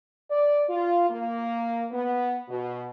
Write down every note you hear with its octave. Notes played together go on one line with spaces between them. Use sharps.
D5
F4
A#3
B3
B2